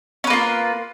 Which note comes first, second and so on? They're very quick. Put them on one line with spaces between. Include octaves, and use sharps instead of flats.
C#4 B4 A#3 F4